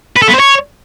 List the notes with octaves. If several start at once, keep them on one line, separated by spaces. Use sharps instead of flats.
B4
A4
B3
C5
C#5